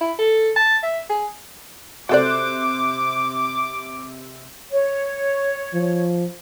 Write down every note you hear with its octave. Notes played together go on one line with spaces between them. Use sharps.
E4
A4
A5
E5
G#4
C3 F#4 A4 C5 D5 D6 F#6
C#5
F3